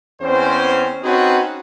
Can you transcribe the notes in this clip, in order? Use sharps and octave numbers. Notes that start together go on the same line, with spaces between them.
E2 C4 C#4 C5
C4 C#4 D#4 F#4 G#4 B4